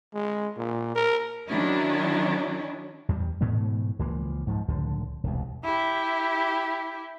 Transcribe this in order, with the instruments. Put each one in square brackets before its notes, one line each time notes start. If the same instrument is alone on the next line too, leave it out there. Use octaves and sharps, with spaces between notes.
[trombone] G#3
A#2
A#4
[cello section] D#3 F#3 C#4 D4 E4
[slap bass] E2 G3
G#2 B2 E3 A3
C#2 E3 F3 A#3
G#2 F3
D1 C#2 D3 F3
E1 C2
[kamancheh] E4 G4